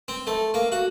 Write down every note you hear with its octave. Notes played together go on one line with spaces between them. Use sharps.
C4
A3
A#3
F#4